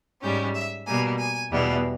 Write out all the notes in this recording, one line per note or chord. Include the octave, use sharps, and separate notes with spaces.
G#2 G3 C#4 G5
E5
B2 G3 A#3 G#5
G#5
E2 B2 G3 B3